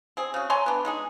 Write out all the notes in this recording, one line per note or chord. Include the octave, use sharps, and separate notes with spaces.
C4 G#4
C#3 F#4
C#5 G#5 A#5 C6
B3 D4
G#3 D#4 G#4